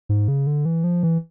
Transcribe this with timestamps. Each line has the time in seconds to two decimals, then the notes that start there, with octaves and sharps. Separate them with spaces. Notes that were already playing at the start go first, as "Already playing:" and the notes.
0.09 G#2
0.28 C#3
0.47 D3
0.65 E3
0.84 F3
1.03 E3